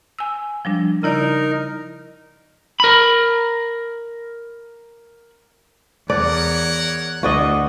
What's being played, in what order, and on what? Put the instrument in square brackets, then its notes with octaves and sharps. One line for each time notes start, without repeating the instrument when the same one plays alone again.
[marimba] G#5 E6
F3 G3 D4
[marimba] C#3 E4 D5 [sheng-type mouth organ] D#4 A#4
[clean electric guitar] A#4 B5
[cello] E2 [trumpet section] A#4 C#5 F#5 [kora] D5
[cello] D2 [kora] F#4 D5 D#5